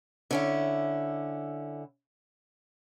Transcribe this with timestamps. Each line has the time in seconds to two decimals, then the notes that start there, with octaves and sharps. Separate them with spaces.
0.31 D3 C#4 E4